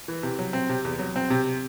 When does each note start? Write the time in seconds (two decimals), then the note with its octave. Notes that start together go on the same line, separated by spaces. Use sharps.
0.08 E3
0.23 C3
0.39 F#3
0.53 C4
0.69 C3
0.85 E2
0.99 F#3
1.16 C4
1.30 C3